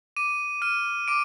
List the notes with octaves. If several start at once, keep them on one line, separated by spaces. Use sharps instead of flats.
D6 D#7
F6 D#7
D6 D7